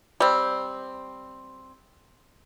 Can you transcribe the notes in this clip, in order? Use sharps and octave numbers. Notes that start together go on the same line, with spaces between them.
G3 C4